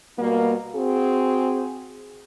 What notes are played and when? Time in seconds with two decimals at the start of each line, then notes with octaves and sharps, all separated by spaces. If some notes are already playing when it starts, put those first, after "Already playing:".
0.19 B2 G3 A#3
0.75 C4 F#4 G#4